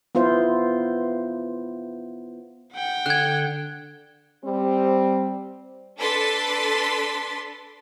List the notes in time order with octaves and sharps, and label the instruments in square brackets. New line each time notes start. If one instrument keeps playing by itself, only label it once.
[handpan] B3 E4 F4 C5
[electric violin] F#5 G5
[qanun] D3 [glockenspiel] F#6 G#6
[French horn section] G3 C4
[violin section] D4 A4 B4 C6 A6 B6